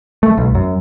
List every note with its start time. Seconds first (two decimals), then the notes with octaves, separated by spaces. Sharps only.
0.23 A3
0.37 B1
0.55 F#2